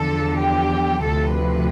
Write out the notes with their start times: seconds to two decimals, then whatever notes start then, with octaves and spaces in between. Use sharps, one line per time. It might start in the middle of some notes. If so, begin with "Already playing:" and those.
Already playing: E2 D3 F3 A4
0.40 G4
1.03 D2 C3 F3 A4
1.35 B4